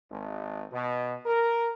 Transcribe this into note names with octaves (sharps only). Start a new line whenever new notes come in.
G#1
B2
A#4